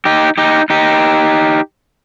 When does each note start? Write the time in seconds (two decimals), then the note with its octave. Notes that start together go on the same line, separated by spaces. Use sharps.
0.05 D#4 G4
0.38 D#4 G4
0.70 D#4 G4